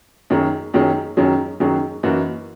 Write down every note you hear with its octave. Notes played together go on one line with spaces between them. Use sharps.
F#2 D#3 F#3 C#4 G#4
F#2 D#3 F#3 C#4 G#4
F#2 D#3 F#3 C#4 G#4
F#2 D#3 F#3 C#4 G#4
F#2 E3 A#3 D#4 F#4